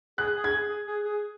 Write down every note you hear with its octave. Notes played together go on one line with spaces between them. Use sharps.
G#4 F#6
G#4
G#6
G#4
G#4
G#4
G#4